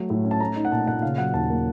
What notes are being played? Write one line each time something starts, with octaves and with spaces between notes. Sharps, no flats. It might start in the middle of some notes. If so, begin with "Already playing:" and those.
Already playing: F#3 A3
A2
C#4
A5
A3 A#5
D#4
F#5
A#2 A5
A#2 F#5
C#3 F5
F#3 F#5
D#2 A5
A#3